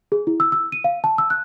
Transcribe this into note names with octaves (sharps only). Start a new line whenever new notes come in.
G#4
E4
E6
E6
D#7
F5
A5
E6
F#6